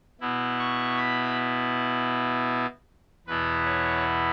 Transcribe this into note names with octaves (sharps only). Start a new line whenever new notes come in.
B2 B3 E4
C#6
B5
E2 B2 B3 E4 B4
C#5